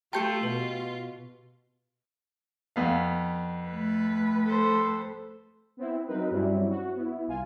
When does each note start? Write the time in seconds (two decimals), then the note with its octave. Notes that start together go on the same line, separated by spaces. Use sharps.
0.13 A3 F4 G4 G5 A5 G6 C#7
0.43 B2 B4
2.76 F2 B3 F5
3.68 A3 B4
4.45 A4 C5
5.77 B3 C4 E4
6.08 F#3 C4 D#4 A#4 B4
6.31 G2 F#3 G3 C4 C#4 E4
6.70 F#4
6.96 B3 E4
7.27 C2 F4 G#5